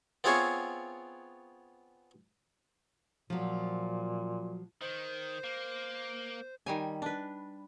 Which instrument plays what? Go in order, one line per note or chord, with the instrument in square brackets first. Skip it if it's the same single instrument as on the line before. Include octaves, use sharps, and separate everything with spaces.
[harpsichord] B3 C4 F4 G#4 C#5 E5
[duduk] A#2 [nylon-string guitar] F3 F#3
[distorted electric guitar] D#3 [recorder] C5
[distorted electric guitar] A#3
[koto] D#3 G3 G#5
D4 B4